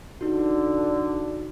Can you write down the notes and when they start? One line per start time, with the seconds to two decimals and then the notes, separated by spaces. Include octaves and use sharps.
0.21 D3 D#4 F#4